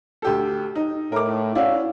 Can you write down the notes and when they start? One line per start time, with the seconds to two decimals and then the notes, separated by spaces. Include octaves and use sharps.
0.22 D2 G4 A4
0.75 D#4
1.12 A2 A#4 D6
1.55 C#4 E4 F#4 D5 F5